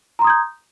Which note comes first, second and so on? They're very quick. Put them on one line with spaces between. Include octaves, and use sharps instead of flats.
A#5 C6 D#6 G#6 G6